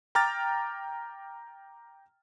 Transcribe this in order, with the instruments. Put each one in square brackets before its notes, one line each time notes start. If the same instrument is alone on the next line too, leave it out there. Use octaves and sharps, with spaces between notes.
[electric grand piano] G5 A#5 D6 F6 A6